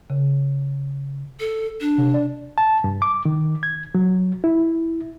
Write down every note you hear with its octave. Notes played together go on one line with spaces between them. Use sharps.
C#3
A4
D4
C3
D5
A5
G2
D6
D#3
G#6
F#3
E4